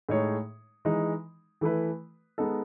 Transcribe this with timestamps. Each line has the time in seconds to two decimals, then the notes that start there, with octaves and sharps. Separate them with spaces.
0.09 A2 G#3 D#4 G#4 C#5
0.85 E3 G#3 D#4
1.61 E3 A3 E4 B4
2.38 G#3 B3 D#4 A4